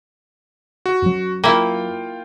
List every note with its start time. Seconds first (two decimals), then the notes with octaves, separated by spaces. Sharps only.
0.86 F#4
1.02 F#2 F#3
1.44 A#3 E4 F4 F5 G5